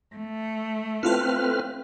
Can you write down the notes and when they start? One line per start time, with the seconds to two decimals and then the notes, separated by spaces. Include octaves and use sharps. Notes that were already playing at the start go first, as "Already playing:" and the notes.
0.16 A3
1.03 C4 E4 F4 A4 B4 F6